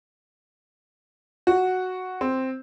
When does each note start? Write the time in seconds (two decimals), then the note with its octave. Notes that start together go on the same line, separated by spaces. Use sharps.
1.47 F#4
2.21 C4